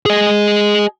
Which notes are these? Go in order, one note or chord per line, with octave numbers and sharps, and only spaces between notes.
G#4 D#5